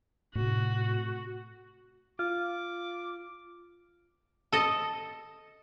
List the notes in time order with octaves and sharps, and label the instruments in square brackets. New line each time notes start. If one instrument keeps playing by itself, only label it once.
[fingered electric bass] A2 C3 [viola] F#4
[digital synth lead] F4 [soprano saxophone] D6
[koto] A4 D#5